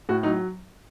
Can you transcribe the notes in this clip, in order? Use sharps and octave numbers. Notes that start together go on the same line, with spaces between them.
A2 F#4
F#3 D#4